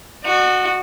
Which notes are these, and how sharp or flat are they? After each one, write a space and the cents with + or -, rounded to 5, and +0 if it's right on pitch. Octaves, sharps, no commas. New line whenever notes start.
F#4 +0 D#5 -45